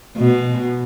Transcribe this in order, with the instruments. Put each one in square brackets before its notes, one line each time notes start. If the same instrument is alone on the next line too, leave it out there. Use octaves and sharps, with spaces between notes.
[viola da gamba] B2